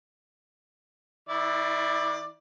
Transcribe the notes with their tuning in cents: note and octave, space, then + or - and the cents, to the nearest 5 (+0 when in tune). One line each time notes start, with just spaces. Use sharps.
E3 -45 E4 +0 D5 +20